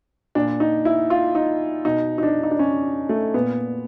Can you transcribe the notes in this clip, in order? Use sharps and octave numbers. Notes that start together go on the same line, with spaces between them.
A#2 D4
D#4
E4
F4
D#4
B2 D#4
D#4
D4
D#4
D4
C#4
A3
A#2 B3